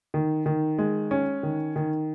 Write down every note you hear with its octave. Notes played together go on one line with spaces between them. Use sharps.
D#3
D#3
G#3
C#4
D#3
D#3